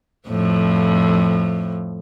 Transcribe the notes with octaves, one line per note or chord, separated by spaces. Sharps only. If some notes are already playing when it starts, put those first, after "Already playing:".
F2 A2 F3